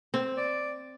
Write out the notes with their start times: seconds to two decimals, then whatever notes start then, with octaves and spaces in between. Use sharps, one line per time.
0.14 C4
0.37 D5